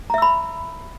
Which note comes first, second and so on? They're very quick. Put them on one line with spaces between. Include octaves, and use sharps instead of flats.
A#5 E5 E6 B5